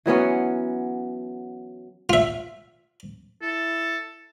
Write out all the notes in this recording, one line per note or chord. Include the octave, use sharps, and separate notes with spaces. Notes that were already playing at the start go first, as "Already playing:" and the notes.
E3 F#3 B3 C#4
F4 E5
E4 A4